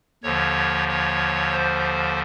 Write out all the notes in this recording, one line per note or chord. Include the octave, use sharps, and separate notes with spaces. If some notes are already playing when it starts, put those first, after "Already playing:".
D#2 D3 F3 C#5
C#5
C5